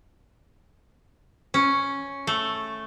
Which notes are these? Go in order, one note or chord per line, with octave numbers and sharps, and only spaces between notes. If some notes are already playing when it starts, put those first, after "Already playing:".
C#4
A3